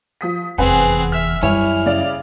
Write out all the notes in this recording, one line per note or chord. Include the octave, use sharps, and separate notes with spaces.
F3 D#6 B6
F1 E2 C4 G#4 B4 F#5 G#5
E5 F6
F#2 G3 E4 C#5 G#5 F6
C#3 D5